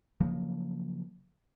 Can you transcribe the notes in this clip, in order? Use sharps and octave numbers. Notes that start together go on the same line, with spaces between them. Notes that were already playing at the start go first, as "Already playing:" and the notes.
C#3 F3 F#3 A#3